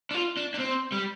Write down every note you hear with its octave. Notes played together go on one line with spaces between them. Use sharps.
D4
F4
D4
D4
C4
G3